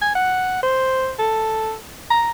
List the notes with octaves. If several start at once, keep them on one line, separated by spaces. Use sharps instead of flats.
G#5
F#5
C5
A4
A#5